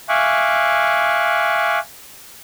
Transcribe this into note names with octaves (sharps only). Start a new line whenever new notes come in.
E5 F5 G#5 C#6 D6 F#6